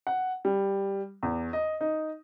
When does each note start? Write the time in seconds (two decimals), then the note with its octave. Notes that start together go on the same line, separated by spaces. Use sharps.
0.07 F#5
0.45 G3
1.23 E2
1.53 D#5
1.81 D#4